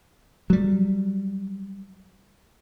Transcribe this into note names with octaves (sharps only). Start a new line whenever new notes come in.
F#3 G3